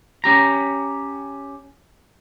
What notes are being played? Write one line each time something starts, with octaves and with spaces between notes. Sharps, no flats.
C#4 G4 A#5